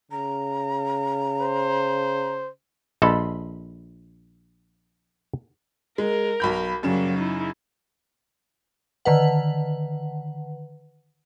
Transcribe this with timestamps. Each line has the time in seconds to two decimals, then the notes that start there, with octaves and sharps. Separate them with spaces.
0.12 C#3 A#5
1.41 C5
3.02 A#1 A4 D#5 A5 B5 C6
5.98 G#3 A#4
6.40 B1 B5 G6
6.83 F#2 C#3 F#3 G3 A#3 E7
7.18 D#4 E4
9.05 D3 D#3 B4 F#5